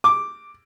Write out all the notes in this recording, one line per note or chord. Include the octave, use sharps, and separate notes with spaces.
D6